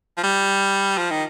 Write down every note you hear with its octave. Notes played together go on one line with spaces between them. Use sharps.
F3
G3
F3
D#3